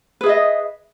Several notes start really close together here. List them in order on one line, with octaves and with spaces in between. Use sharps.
B4 G#4 E5 D#5